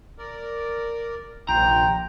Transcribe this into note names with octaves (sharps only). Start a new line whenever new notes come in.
A#4 D5
A#1 D#2 C3 G5 A#5 C6